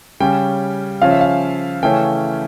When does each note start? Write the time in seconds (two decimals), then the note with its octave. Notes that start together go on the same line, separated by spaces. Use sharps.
0.20 C#3 G3 C#4 G5
1.01 C#3 F3 C#4 F5
1.11 E5
1.21 F5
1.83 C#3 E3 A3 C#4 G5